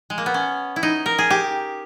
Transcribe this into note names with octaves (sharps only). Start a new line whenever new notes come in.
G#3
A#3
B3
C#4
E4
D#4
A#4
G#4
G4